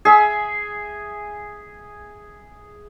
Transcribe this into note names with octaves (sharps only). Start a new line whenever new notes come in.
G#4 E5